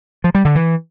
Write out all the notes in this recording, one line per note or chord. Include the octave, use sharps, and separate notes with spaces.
F3
G3
D3
E3